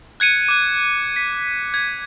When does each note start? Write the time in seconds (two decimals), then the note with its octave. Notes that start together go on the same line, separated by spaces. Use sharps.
0.20 F#6 G#6 C#7 D#7
0.48 D6 F#6
1.16 B6
1.74 G#6